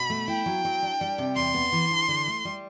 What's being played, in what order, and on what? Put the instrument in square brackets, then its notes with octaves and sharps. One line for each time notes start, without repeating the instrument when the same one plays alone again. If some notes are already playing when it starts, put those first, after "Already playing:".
Already playing: [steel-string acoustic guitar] B2 [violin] B5
[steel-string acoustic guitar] A3
[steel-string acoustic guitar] E4 [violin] G5
[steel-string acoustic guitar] F#3
F#3
D4
G3
C3
[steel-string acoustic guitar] E2 [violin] C6
[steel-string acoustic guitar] B3
E3
D3
D3
A3
G3